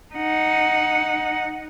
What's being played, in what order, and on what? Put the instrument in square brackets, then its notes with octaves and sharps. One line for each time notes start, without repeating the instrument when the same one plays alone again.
[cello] D#4 F#5